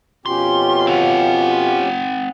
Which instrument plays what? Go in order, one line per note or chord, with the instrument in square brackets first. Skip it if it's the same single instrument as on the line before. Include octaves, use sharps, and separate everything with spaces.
[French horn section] F2 B2 F4 [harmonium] C#4 G4 [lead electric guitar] C6
[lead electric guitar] C4 F#5